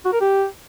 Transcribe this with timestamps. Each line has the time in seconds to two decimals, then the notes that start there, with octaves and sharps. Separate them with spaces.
0.05 F#4
0.13 A#4
0.21 G4